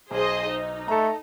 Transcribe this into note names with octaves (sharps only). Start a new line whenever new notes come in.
B1 G#4 C5 D#5
D#4
A3 A4 A#5